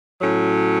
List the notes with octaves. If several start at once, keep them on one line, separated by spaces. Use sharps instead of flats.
A2 F#3 C#4